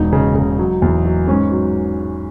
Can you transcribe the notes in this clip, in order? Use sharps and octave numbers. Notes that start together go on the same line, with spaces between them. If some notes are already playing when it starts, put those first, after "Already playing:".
Already playing: E1 D#4
C#3
C#3
F#3
E2
F#3
G#2 C#4
F#3